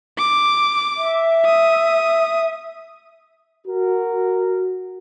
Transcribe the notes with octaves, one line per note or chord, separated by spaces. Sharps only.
D6
E5
D#6
F#4 A#4